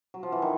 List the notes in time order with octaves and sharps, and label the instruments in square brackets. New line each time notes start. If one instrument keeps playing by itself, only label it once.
[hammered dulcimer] F#3
F3
E3
D#3